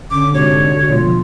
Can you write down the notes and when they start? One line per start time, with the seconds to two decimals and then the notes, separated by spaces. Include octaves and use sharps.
0.11 D3 C#4 D6
0.34 G#2 C3 F#4 C#5
0.89 B2 E3 G#3 F4
1.03 B2 F3 A3